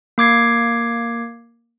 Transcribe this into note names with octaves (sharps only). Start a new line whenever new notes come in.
A#3 D6 G#6 C7